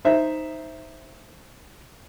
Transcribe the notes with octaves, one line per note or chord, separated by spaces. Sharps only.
D#4 C5 E5